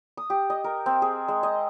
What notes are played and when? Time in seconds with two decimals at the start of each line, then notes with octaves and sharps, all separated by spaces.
0.17 D#6
0.30 G4
0.50 D#5
0.64 A#4
0.86 C4
1.02 G#4
1.28 G#3
1.43 D#5